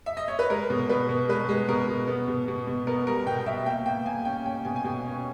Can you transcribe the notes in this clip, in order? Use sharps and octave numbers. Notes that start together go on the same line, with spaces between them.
E5
D#5
C#5
B4
G#3 A#4
B2
B2 B4
B2
G#3 B4
G#3
B2 A#4
B2
B3
B2
B2
B2
B3 A#4
G3 A#4
B2 G5
G5
B3 E5
A#3 G5
A#3 G5
A#3 G#5
C#4 G5
C#4 G5
B2 G#5
G#5
B2 G5
C#4